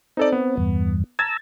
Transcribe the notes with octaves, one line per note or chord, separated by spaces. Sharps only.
C4 D#4 A4 D5
B3
E2 G2
A5 A#5 E6 G#6 A6